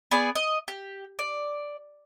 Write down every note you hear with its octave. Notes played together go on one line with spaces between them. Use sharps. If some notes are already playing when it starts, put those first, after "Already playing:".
B3 G#4 D5 G#5
D#5
G4
D5